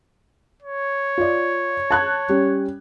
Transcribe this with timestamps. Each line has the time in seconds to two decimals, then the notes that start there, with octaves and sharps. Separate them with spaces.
0.62 C#5
1.18 F4 D5
1.91 A5 F#6 G#6
2.29 G3 C#4